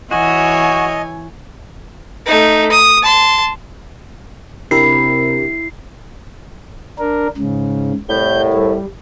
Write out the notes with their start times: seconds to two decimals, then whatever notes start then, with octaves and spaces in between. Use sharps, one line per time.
0.11 E3 F#4 C#5 D#5 G#5
2.26 A3 D#4
2.71 D#6
3.02 A5 C6
4.71 C3 D4 E4 G4 A#4 C7
6.99 D4 A#4
7.37 G#2 C#3
8.09 C2 A2 G6
8.53 G3